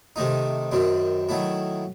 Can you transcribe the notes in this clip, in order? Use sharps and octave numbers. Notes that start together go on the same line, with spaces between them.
C3 D#3 A3 D#4
F#2 D#3 F#3 C4
D#3 F#3 A3 E4